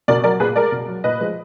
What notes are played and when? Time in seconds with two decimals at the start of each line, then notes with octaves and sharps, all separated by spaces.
0.08 B2 A#4 D5
0.24 F#3 A#4 D5
0.40 A#2 G#4 B4
0.56 G#3 A#4 D5
0.72 B2
0.88 F#3
1.04 A#2 B4 D#5
1.20 F3 G#3